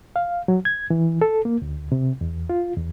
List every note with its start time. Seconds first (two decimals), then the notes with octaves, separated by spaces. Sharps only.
0.16 F5
0.48 F#3
0.65 G#6
0.90 E3
1.21 A4
1.45 A#3
1.62 D2
1.92 C3
2.21 E2
2.50 F4
2.77 E2